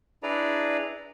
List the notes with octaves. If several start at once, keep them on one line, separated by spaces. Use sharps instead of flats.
D4 E4 G#4 B4 D5 A#5